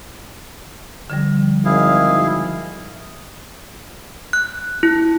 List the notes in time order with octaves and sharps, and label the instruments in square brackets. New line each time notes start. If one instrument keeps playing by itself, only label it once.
[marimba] D3 F3 G3
[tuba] G#1 [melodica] E4 G#4 F5
[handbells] F#6
E4